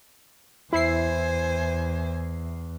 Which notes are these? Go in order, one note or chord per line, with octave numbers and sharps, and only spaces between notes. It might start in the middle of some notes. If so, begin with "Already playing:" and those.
E2 E4 C5 G#5 C7